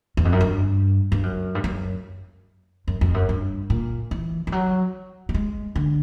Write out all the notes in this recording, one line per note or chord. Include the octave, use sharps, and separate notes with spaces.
E2
F2
F#2
G2
G2
F#2
G2
F#2
F#2
F2
F#2
G2
A#2
E3
F3
F#3
G3
G#3
D3